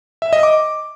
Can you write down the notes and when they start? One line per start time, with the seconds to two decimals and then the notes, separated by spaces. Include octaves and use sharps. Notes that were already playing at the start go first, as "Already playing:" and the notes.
0.22 E5
0.33 D#5
0.43 D6